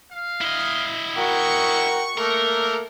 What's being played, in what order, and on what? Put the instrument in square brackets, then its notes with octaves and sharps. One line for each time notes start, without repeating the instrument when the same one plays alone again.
[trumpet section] F5
[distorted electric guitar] E4 D#5
[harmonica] F#4 A#4 G5 [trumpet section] C#6
[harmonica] A3 A#3 [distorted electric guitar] A#4